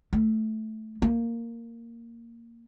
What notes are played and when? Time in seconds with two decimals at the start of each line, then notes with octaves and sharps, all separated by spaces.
0.13 A3
1.02 A#3